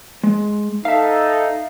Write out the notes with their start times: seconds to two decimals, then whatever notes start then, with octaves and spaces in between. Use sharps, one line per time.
0.23 G#3
0.85 D#4 A4 E5 F5